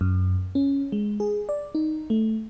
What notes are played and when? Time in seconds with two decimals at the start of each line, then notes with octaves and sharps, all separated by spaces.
0.01 F#2
0.55 C#4
0.92 G#3
1.20 G#4
1.49 D5
1.75 D#4
2.10 A3